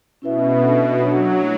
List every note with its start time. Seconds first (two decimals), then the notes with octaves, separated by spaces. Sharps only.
0.22 B2 C#4 E4 B4 E5
0.62 D4 F#4 A4 E5
1.01 F#3 D4 F#4 C#5 F#5
1.41 A3 E4